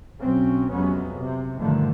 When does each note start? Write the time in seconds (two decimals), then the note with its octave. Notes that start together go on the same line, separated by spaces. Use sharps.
0.20 B1 F#3 C4 C#4
0.71 F2 C3 F#3 G#3 B3 C#4
1.15 C3
1.58 G2 A#2 D3 D#3 F3 A3